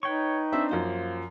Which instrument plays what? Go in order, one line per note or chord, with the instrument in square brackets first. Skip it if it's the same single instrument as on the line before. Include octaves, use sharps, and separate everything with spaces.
[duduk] D#4 [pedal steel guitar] B4 G5 C#6 [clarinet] C#5
[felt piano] C4 D4 [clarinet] E5
[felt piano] F#2 F3 [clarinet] A#3 [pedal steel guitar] C5